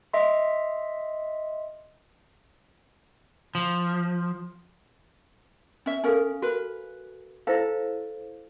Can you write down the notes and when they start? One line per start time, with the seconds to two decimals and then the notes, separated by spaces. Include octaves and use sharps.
0.14 D#5 E5 C6
3.55 F3
5.86 C#4 E5
6.04 C#4 A4 A#4 F5 G#5
6.42 F#4 A#4 B4
7.47 E4 A4 C5 F5